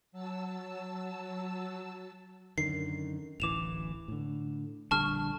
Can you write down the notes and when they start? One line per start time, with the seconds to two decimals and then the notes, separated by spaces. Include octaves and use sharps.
0.12 F#3 A5 E6
2.58 F#2 D3 D#3 C7
3.40 D1 A1 E3 D6 E7 F7
4.08 A2 D3
4.91 A#1 D3 G3 A5 C#6 F6